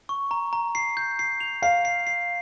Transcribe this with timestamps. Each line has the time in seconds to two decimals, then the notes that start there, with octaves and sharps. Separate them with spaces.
0.09 C#6
0.31 A#5
0.53 A#5
0.75 C7
0.97 G6
1.19 C7
1.40 F7
1.62 F5 C7
1.85 C7
2.07 C7